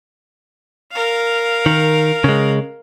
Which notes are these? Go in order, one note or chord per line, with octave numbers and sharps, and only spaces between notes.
A#4 F5
D#3
C#3 G#3